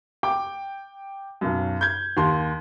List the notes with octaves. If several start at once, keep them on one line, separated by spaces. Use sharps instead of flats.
G5 D6
B1 F#2
G6 G#6
D#2 C6